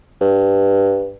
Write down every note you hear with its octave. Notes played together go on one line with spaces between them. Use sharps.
G2